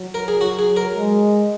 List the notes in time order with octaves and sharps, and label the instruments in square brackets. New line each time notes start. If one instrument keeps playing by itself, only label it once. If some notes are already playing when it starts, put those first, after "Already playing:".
Already playing: [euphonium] F#3
[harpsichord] A#4
G#4
[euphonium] F#3 [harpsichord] F#4
[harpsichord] G#4
A#4
[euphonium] G#3